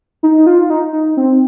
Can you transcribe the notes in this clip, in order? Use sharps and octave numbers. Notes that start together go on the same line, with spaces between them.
D#4
F4
D#4
D#4
C4